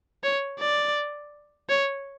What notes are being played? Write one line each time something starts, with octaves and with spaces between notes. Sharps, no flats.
C#5
D5
C#5